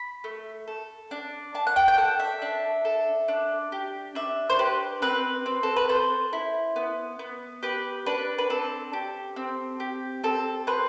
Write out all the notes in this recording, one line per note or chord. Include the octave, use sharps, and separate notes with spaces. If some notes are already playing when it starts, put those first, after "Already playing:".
Already playing: B5
A3
A4
D4
D4 A5
F#5
G5
G5
A4 F#5
E5
D4
A4
D4
G4
D4 E5
C5
G4 B4
C4 B4
C4
A4
B4
A4 C5
E4
B3
B3
G4 B4
D4 B4
B4
C4 A4
G4
C4
G4
C4 A4
C4 B4